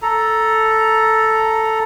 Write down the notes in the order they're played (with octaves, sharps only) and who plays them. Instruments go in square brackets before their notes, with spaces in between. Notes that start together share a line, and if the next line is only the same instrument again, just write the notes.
[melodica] A4 A#5